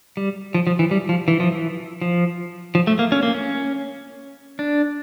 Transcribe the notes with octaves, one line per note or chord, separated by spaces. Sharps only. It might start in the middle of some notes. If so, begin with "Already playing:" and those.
G3
F3
F3
E3
G3
F3
E3
F3
E3
F3
F3
A3
A#3
C#4
A#3
C#4
D4